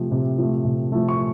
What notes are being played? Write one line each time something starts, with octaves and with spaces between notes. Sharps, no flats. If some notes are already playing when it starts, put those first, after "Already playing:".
Already playing: C3 F3 A3
C3
F3 A3
C3
F3 A3
C#6